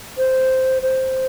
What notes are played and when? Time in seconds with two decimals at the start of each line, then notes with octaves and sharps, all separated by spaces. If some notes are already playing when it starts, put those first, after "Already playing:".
0.18 C5
0.82 C5